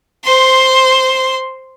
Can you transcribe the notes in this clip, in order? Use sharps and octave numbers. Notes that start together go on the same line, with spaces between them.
C5 C6